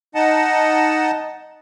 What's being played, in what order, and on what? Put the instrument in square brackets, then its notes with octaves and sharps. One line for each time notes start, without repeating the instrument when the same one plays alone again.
[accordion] D#4 D#5 F#5 A5